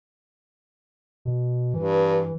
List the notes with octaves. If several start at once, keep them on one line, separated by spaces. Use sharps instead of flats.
B2
G2 E3